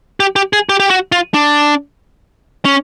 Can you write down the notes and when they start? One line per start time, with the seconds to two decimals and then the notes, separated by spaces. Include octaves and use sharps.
0.20 G4
0.36 G4
0.53 G#4
0.69 G4
0.80 G4
0.90 F#4
1.12 F4
1.34 D4
2.65 C#4